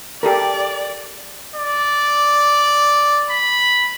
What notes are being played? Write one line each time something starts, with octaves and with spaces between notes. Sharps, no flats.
G4 A4 A#4 D5
D5
B5